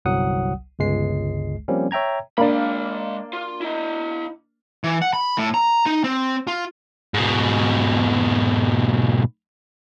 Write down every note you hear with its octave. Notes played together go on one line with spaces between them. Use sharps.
G1 C2 F#3 F#5 D#6
G1 C#2 G#3 C7
F3 G3 A#3 C4 C#4
C#5 E5 G5 A#5 G#6
G#3 A#3 D4 B5
F4
E4 D#5
E3
F#5
B5
A2
A#5
D#4
C4
F4
G#2 B2